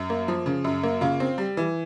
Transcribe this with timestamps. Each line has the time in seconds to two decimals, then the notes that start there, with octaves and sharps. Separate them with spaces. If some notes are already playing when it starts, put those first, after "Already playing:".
Already playing: F#2
0.10 A#3
0.28 F3
0.46 C#3
0.64 F#2
0.83 A#3
1.01 C#3 F4
1.20 C4
1.38 G3
1.57 E3